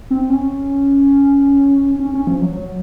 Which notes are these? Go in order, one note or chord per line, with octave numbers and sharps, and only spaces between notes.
C4
C#4
C#4
C#4
F3
F#3
F#3